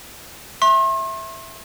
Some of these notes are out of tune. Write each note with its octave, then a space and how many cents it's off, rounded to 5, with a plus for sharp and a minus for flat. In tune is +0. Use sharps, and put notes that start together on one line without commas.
E5 +0 C6 +45